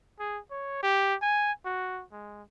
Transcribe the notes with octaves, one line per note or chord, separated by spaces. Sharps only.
G#4
C#5
G4
G#5
F#4
G#3